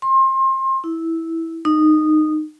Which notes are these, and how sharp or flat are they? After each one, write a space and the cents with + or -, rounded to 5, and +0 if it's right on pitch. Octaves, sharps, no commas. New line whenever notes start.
C6 +30
E4 -10
D#4 -15